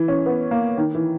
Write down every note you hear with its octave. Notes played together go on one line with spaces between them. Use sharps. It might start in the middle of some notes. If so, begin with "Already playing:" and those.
Already playing: E3
C#4
B3
A#3
D#3
E3